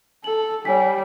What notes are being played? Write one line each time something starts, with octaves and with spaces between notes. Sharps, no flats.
A4 F#7
G3 C#5 G#5 B6